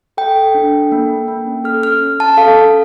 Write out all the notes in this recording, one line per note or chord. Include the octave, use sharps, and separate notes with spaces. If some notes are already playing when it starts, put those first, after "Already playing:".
A4 G5
A4
D4
A4
A#3
A#3
A#3
C#4
A4 F6
C#4 F6
C#4
C#4 A5
A4 F5
C#4